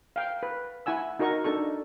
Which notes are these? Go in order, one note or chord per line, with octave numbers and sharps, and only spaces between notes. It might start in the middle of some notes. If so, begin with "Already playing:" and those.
F5 G5
B4
E4 F#5 G#5 E6
D#4 F#4 A#4 D#5 C#6
D4 D#4 A4 C#6